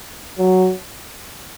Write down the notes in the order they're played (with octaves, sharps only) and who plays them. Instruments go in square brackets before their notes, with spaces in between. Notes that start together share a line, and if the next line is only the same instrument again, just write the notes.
[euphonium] F#3